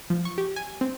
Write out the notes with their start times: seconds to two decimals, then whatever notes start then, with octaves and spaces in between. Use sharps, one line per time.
0.10 F3
0.25 C#6
0.38 G4
0.56 G#5
0.81 C4